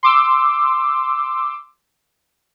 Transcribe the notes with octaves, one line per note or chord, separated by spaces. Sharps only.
C6 D6 E6